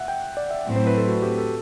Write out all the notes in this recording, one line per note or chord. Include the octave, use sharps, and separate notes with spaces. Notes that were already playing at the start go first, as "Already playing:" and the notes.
Already playing: E5 F#5
G5
D5
E5
A2 F#3 A3 C4 E4
C5
B4
A4
F#4
G4
A4